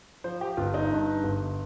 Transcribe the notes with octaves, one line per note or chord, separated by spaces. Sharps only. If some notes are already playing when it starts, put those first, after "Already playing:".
F3 C5
G4
G1 F4
D#4
G2
G1